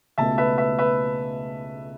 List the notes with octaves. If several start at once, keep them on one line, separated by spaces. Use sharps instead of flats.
C#2 B2 A3 E5 A5
B4 E5
B4 E5
B4 E5